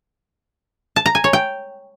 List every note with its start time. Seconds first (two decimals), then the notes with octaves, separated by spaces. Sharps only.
0.96 A5
1.06 A#5
1.15 G#5
1.24 C#5
1.33 G5